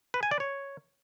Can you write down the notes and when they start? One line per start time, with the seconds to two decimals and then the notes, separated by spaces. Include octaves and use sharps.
0.14 B4
0.23 G#5
0.31 D5
0.40 C#5